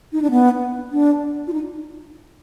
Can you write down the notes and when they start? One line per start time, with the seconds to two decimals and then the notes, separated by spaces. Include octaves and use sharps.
0.13 D#4
0.22 D4
0.31 B3
0.92 D4
1.47 F4
1.53 D#4